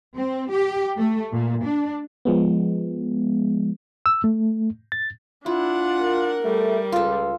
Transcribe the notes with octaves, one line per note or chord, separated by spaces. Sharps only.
C4
G4
A3
A#2
D4
F3 G#3 B3
E6
A3
A6
D4 E4 F4 F#5
A#4
G3 A3
C#2 F4 A4